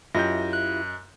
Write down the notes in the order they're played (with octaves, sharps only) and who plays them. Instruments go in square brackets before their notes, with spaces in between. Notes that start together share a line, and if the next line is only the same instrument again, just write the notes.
[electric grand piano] F#2 D#5 G6 [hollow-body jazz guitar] E4 F4 G4 [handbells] A#6
[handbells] F#6